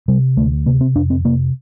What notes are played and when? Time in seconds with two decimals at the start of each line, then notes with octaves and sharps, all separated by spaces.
0.08 C3 G3
0.37 D2 A3
0.66 C3 A#3
0.81 C4
0.95 F2 D4
1.10 C4
1.25 C3 A#3